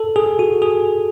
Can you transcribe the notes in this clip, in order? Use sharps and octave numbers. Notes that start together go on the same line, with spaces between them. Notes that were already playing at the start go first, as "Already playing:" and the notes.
Already playing: A4
G#4
F#4
G#4